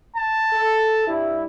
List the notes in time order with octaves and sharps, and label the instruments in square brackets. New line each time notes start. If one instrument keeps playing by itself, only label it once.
[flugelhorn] A5
[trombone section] A4
G2 G3 E4